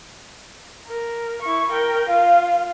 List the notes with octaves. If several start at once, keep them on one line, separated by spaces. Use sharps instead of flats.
A#4
E4 C#6
A#4 G5
F4 F5